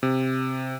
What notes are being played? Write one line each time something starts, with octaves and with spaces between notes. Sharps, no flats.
C3